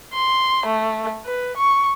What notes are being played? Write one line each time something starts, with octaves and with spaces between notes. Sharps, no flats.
C6
A3
B4
C#6